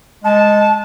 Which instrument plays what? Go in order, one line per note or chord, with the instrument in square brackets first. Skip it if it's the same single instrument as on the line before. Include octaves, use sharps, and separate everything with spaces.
[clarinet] G#3 [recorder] A5